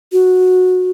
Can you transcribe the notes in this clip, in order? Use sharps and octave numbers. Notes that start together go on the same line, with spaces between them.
F#4